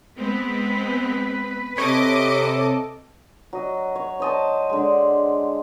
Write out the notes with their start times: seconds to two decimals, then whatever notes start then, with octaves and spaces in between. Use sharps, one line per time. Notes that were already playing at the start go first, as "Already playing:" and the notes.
0.18 G#3 B3 C4 B4
1.78 C3 A4 C#5 D#5 D6
3.53 F#3 D#5
3.95 C#5
4.20 C5 D#5 A5
4.69 D3 G#3